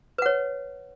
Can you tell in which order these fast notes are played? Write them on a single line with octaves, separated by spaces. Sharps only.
B4 F#5 C#5